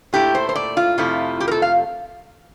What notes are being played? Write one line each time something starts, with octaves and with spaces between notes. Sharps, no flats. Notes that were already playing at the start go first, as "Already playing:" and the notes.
A#2 A3 E4 G4
C5
C5
D5
F4
F2 C3 F3 A3 E4
G4
A#4
A4
F5